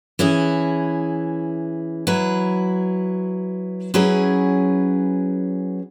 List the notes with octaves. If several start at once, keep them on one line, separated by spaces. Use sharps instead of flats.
E3 C#4 E4 G#4
F#3 E4 B4
F#3 C#4 E4 G#4 B4